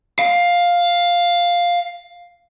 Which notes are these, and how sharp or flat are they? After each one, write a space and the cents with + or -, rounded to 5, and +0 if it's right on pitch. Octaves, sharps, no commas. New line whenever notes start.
F5 +5